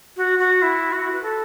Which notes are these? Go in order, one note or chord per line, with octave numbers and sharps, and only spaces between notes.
F#4
F#4
E4
F#4
B4
A4